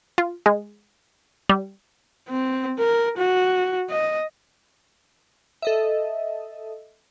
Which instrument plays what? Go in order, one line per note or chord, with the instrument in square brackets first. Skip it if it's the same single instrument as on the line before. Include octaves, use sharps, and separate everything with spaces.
[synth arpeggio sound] F4
G#3
G3
[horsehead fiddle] C4
A#4
F#4
D#5
[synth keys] A4 D#5 E5